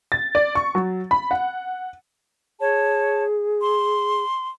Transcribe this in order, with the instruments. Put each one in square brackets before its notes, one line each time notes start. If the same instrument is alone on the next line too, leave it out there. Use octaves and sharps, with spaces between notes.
[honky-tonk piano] A6
D5
C#6
F#3
B5
F#5
[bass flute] G#4 [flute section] C#5 A5
[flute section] C6